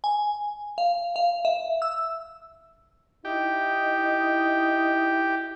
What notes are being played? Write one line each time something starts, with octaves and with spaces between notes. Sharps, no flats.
G#5
F5
F5
E5
E6
D#4 E4 G4